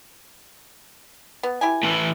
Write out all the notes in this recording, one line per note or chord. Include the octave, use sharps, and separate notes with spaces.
B3
E4 G4 G#5
A2 E3